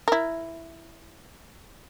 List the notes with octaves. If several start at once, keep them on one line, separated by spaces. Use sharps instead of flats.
E4 A#4